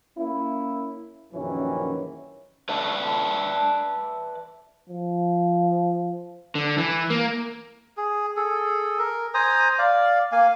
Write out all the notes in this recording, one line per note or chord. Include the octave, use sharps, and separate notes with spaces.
A#3 C#4 E4
A#1 F#2 D#3 E3 C#4
B4 D5 E5 A5
F3
D3
E3
A#3
G#4
G#4 A4
A#4
C5 G#5 A#5 D#6
D5 F5
A#3 F5 G#5